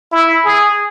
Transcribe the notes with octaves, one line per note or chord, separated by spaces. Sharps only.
E4
G#4